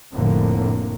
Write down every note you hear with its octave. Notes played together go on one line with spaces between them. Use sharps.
F1 A2 D3 A#3